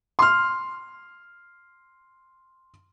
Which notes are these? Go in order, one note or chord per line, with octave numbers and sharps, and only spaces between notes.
C6 F6